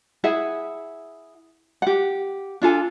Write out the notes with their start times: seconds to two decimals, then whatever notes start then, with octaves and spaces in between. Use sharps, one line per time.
0.24 E4 G#4 E5 F#5
1.82 G4 F#5
2.62 D4 F4 A4 G#5